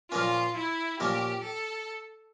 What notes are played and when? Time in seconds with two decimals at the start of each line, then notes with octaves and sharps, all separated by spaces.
0.12 A#2 F3 A#3 C#4 F4
0.56 E4
1.00 A#2 F3 A#3 C#4 G4
1.44 A4